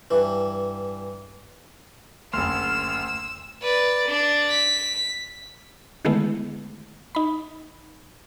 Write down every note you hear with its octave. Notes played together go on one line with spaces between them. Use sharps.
G2 E3
F#1 D2 C6 E6 F6
B4 D5
D4
B6
D3 D#3 G#3 A3 B3 E4
D#4 B5